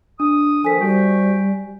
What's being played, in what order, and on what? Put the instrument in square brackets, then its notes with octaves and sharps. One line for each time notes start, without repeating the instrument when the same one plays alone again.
[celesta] D4 [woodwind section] D#6
[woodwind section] A#2 D#3 F3 [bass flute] A4 [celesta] G#5 B6
[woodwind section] C3 F#4 G5 [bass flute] G3